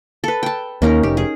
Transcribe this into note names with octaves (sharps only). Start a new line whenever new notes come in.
A4 B4
G5 A5
D#2 A#3 C#4 D#4 A#4
F1 G4
G#4